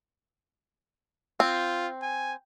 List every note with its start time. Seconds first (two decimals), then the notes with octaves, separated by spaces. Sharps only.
1.40 C4 F4
2.02 G#5